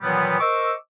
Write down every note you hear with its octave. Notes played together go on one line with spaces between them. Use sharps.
A#2 D#3 E3 F#3 G3 B3
A#4 C5 D#5 C#6 D6 E6